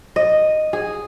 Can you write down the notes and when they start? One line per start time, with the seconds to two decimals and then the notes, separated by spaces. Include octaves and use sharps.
0.16 D#5
0.73 G#4